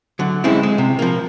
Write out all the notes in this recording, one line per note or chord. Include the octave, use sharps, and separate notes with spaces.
D3 F#3
G#3 C4 C#4 E4
G#3
C3
F3 A#3